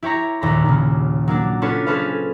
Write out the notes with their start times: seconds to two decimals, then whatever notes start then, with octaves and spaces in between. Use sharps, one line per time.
0.03 E4 G4 C#5 A#5
0.41 A#1 D#2 A#5 B5
0.65 D#2 C#3
1.28 F#3 A#3 D4
1.62 C#4 D4 F4 A4 B4 C#5
1.86 C#4 G#4 A4 B4 C5 F5